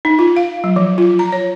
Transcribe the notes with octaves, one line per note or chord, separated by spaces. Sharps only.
D#4
F4
F5
F#3
F3
F4
A#5
C#5